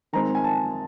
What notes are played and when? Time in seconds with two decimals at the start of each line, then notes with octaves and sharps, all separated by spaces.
0.13 D#3 G#3 C4 A#5
0.35 G#5
0.44 A5